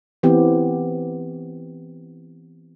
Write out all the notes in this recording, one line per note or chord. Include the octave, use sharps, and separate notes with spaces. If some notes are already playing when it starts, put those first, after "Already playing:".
E3 B3 C4 G4